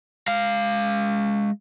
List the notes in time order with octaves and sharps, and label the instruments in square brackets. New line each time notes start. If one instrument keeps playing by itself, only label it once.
[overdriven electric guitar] G#3 F5